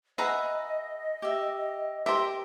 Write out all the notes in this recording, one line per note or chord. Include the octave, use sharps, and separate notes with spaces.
G#4 B4 D#5 E5 F#5 A#5
G4 E5
G4 A#4 C5 E5